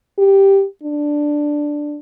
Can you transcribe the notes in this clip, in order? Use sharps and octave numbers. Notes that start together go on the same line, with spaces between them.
G4
D4